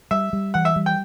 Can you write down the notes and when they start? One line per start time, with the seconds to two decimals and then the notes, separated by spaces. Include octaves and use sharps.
0.11 G3 E5
0.33 G3
0.54 E3 F#5
0.65 E5
0.76 G3
0.86 G5